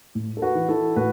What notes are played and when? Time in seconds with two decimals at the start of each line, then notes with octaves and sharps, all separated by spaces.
0.15 A2
0.37 A4
0.42 F#4 B4
0.55 E3
0.69 E4 A4
0.96 A2 F#4 B4